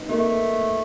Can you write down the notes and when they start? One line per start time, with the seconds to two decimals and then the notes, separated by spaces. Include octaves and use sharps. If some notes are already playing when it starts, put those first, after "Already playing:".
Already playing: D#4 B4
0.09 A3 A#3